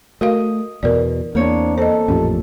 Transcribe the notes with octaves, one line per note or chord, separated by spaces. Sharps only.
A3 F#4 A#4 D#5 F5
E2 B2 A#4 D5
E2 A#3 C4 D4 C#5
A4 C5 D#5
A1 F2 A#2 C#4 G4